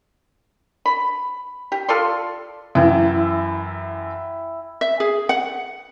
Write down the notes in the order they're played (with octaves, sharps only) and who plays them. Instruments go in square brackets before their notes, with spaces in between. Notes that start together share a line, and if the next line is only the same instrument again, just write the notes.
[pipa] B5
G4
F4 A4 D5 C6
[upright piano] F#2 E3 [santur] E4 F#5 G5
[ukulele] E5
G#4
F#5